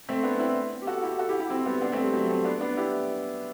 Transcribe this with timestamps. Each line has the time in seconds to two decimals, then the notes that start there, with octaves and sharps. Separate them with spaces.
0.09 A3 C4
0.24 B3 D4
0.39 C4 E4
0.82 G4
0.87 F#4 A4
1.03 E4 G4
1.19 F#4 A4
1.29 E4 G4
1.40 E4 G4
1.50 C4 E4
1.66 G3 B3
1.82 B3 D4
1.92 A3 C4
2.04 G3
2.13 F#3 A3
2.29 A3 C4
2.45 B3 D4
2.61 B3 D4
2.77 E4 G4